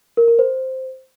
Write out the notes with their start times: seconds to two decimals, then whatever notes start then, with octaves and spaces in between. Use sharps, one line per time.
0.17 A#4
0.28 A#4
0.39 C5